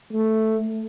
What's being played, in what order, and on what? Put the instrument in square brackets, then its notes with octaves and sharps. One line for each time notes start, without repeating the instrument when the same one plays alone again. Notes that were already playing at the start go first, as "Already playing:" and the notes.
[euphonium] A3